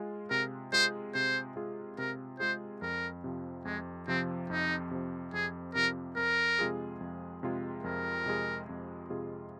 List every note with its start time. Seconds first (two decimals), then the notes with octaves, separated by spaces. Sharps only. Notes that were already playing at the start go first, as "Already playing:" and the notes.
Already playing: G#3 F4 G#4
0.31 C3 A#4
0.73 G#3 F4 G#4 C5
1.14 C3 C5
1.56 G#3 F4 G#4
1.98 C3 A#4
2.40 G#3 F4 G#4 C5
2.82 F2 A#4
3.24 C3 F3
3.65 F2 G#3
4.08 C3 F3 C4
4.50 F2 D#4
4.91 C3 F3
5.33 F2 G#4
5.75 C3 F3 A#4
6.17 F2 A#4
6.59 C3 G#3 F4 G#4
7.01 F2
7.43 C3 G#3 F4 G#4
7.84 F2 A#4
8.26 C3 G#3 F4 G#4
8.69 F2
9.10 C3 G#3 F4 G#4